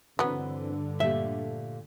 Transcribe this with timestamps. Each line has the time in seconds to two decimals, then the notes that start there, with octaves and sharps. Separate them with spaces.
0.19 G2 D3 E3 F#3 B3 C4
1.00 A#2 A3 G4 E5